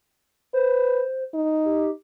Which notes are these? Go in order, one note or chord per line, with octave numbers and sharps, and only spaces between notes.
B4 C5
D#4
G4